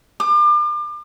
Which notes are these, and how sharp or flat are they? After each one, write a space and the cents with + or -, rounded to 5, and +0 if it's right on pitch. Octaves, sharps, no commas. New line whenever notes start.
D6 +35